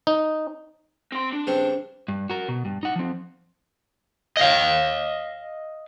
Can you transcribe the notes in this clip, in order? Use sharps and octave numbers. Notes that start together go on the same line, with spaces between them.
D#4
C4 C6
D4
G2 C#3 C4
G2
F#4 A#4
B2
G2
D#4 F#5
F3 C4
D#5 F5